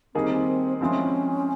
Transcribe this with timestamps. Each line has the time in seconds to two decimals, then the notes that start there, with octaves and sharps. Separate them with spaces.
0.14 D#3 G3 A#3 C4 D#4 G#4
0.81 F3 G#3 C4 C#4 E4 G#4